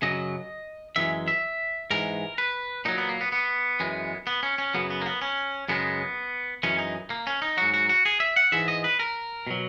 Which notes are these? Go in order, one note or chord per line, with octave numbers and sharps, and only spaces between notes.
F#2 C#3 F#3 D#5
F#2 E3 G#3 E5
E5
G#2 E3 G#3 A#4
B4
A#2 F#3 D#4
B3
A#3
B3
B3
F#2 E3 G#3
B3
C#4
C#4
F#2 C#3 F#3 B3
B3
A#3
B3
C#4
F#2 C#3 G#3 B3
F#2 E3 G#3 C#4
D#4
A#3
C#4
D#4
G#2 F#3 F#4
F#4
F#4
G#4
E5
F#5
G#2 E3 G#3 E5
D#5
B4
A#4
B2 F#3